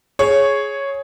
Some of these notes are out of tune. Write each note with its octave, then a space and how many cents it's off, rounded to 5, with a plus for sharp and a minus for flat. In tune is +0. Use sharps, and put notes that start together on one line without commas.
G#4 +10 C#5 +0